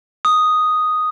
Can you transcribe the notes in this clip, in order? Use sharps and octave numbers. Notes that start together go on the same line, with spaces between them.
D#6